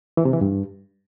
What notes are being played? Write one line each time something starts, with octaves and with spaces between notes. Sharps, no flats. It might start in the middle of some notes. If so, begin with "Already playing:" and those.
E3
C3
E3
G2